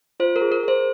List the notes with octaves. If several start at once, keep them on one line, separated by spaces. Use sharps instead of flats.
F4 C5
A#4
G#4
A#4
G#4 C5